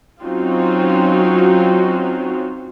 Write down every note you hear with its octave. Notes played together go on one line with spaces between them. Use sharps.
F#3 C4 C#4 D#4 F4 F#4